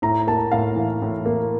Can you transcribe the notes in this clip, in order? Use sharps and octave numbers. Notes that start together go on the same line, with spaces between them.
A2 A#5
A#3 A5
A2 F5
E3
A2
A#3